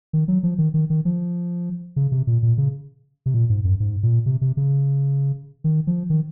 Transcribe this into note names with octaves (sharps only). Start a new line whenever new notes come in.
D#3
F#3
F3
D#3
D#3
D#3
F3
C#3
C3
A#2
A#2
C#3
C3
A#2
G#2
F#2
G#2
A#2
C3
C3
C#3
D#3
F3
D#3